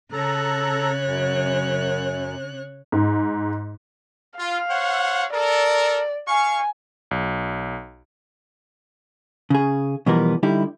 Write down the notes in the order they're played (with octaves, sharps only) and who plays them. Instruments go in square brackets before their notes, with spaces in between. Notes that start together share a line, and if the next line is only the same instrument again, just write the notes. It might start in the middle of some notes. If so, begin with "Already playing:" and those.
[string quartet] C#3 C#5 F#6 [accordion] A4 A#5
[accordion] F#2
[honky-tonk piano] G#2
[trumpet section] F4 [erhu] F5
[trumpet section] C5 C#5 F#5
[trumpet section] A4 A#4 [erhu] D5
[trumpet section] F5 C#6 [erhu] G#5
[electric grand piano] B1
[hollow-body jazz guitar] C#3 G#4
B2 E3 F3 G3 B3 A#4
D3 G3 D#4 E4 G4